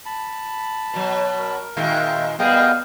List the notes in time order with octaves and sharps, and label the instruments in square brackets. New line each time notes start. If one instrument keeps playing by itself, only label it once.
[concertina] A5 B5
[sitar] B2 F#3
[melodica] A#4
[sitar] A#2 D#3 G#3 [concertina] E5 F5 G5
[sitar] B2 G3 G#4 [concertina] B3 A#4 [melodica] D#5 F5 G5